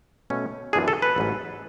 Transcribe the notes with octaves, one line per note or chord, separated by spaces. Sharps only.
B2 A3 C#4
F#2 E3 G#3 B3 D4 G#4
A4
B4
A1 G#2 F#3 C#4